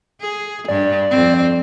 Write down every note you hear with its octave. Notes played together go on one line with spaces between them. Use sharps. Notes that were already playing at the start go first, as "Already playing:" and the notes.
G#4
G2 D5
F2 C4